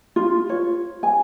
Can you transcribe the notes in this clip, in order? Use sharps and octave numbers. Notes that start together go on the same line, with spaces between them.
F4
C#5
G#5